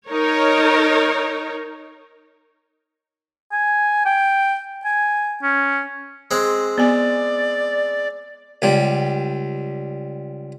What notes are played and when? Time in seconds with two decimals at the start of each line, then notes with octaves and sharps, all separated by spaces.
0.10 D#4 A#4 C#5
3.52 G#5
4.05 G5
4.85 G#5
5.42 C#4
6.31 G#3 C4 G#4
6.78 B3 D5 G#5
8.62 C#2 G3